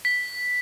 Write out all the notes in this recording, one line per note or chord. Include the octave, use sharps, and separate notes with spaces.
B6